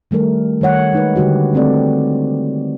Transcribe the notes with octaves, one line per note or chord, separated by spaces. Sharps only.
D#3 G3 A3 A#4
D#3 G3 C#5 F#5
G#3 D#4 B4
D3 G3 F#4 G4
G#3 A3 C4 A4 D5